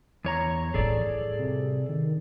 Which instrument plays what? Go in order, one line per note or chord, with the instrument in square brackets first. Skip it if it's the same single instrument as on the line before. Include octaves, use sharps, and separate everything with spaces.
[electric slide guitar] E2 C#5 A#5
[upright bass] A2 G3 [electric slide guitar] G#4 A4 D5
[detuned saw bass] C3
D#3